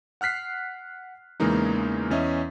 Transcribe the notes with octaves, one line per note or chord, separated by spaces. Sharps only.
F#5 F6 F#6 B6 C7
E2 C#3 E3 G#3 A#3 D#4
E2 C#4 D#5 E5